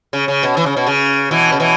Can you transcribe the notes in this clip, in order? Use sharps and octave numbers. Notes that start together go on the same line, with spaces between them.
C#3
C#3
B2
E3
C#3
B2
C#3
B2 E3
C#3
B2 E3